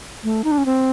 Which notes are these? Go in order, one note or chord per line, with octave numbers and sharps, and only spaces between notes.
A3
D#4
D4
C#4
C4